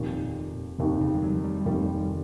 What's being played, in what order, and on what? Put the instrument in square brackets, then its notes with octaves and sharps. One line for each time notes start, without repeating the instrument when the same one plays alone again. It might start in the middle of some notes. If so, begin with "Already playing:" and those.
Already playing: [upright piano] F1 D#2 D#3 [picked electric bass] A#2
[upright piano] F1 D#2 D#3 [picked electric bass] C3
[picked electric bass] C#3
G3
F#3
G3
[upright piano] F1 D#2 D#3 [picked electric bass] G3